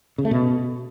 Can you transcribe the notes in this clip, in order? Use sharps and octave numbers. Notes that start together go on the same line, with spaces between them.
C#3
A3
B2